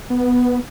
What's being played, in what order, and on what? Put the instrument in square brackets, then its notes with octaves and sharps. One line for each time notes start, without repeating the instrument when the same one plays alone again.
[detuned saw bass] B3